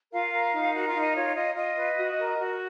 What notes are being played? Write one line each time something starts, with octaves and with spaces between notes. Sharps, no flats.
F4 A#4 F5
A#4
D#4
F#4 A#4 F#5
F4 F5
D#4
D#5
F4 C#5
F4 D#5
F4 D#5
B4
F#4
A#4
F#4